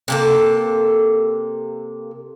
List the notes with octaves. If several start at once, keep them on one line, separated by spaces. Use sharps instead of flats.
C3 A#3 A4